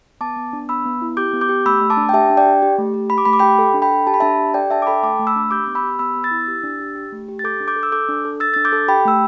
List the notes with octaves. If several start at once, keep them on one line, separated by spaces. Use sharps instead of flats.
B3 A5 D6
B3
D4
B3 B5 E6
B3
E4
G4 D6 G6
B3
D6 G6
G4
A3 B5 E6
A3
A5 D6
D4
G5
G4 E5 A5
D4
D5 G5
G4
G4
A3
G4
G4 B5
D6
A3 B5
D6
G4 G5 B5
A4
D4
G5 B5
A4
G4 A5
B5
D4 E5 A5
G4
A4 D5 G5
D4 E5 A5
D6
A4 G5 B5
A3 A5 D6
A3
B5 E6
D4
G4 D6 G6
B3
B5 E6
G4
B3 B5 E6
B3
E6 A6
E4
G4
D4
G4
G4
A3
G4
A6
A4 D6 G6
D4
D6 G6
A4
E6
A4 D6 G6
D4
A4
A4 E6 A6
D4 A6
D6 G6
A4
G4 G5 B5
A3 E6